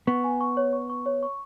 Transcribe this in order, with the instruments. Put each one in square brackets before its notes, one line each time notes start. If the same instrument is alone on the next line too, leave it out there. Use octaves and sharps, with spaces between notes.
[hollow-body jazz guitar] B3 [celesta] C#6
[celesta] G#5
C#6
C#5
C#6
C#6
C#5
C#6